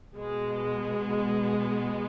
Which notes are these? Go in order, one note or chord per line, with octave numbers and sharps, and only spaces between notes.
B2 G#3 B3